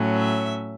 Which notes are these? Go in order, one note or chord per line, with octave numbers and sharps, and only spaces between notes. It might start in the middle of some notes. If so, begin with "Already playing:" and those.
Already playing: A2 F#3 C#4
E5